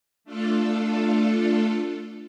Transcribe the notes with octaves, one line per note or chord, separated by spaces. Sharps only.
A3 D4 F4 A4